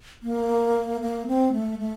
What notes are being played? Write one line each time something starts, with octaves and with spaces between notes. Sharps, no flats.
A#3
A#3
C4
A3
A3